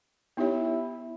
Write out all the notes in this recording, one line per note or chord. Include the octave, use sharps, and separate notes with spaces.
B3 D#4 E4 G4 C#5